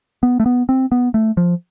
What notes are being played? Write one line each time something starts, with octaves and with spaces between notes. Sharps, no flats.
B3
A3
B3
C4
B3
A3
F3